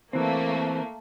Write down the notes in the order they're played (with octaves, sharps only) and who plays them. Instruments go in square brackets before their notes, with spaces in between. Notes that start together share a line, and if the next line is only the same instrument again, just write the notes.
[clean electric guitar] E3 C4 [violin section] A3 A#3